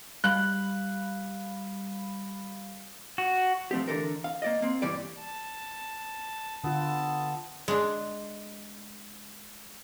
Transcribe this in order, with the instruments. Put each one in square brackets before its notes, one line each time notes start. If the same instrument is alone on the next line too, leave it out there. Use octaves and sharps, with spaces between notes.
[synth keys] G3 F5 B5 [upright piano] F#6
[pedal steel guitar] F#4
[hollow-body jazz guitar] F3 A3 C4 G4
D3 E3 A4 A#4
F5
A#3 D5 D#5
A#3 C4
G2 C#3 E3 G3 D5
[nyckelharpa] A5
[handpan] D3 F4 [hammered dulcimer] B3 A4 [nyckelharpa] A5
[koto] G#3 D4